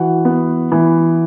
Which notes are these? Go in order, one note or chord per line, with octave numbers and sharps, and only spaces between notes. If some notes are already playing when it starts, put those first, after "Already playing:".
Already playing: E3 F#4 F#5
B3
E3